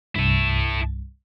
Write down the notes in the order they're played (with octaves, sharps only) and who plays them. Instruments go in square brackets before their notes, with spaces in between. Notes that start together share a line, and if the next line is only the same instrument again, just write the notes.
[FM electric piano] C2 G2 [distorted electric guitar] E4 A4